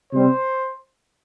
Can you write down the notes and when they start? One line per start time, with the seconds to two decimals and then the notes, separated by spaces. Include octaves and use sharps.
0.13 C3 G3 C4 C5